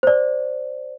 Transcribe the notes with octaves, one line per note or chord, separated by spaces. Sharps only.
C5 D5